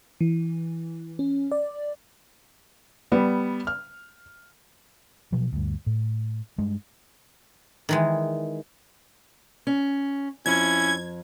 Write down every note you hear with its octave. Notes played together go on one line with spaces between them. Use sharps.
E3
C#4
D5
G3 B3
F6
B2 F3 F#3
D2 G2
A2
G2 G#3
D#3 E3 G#3
C#4
F2 C#4 E4 G#6